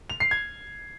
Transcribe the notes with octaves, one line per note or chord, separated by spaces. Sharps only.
F7
C7
G#6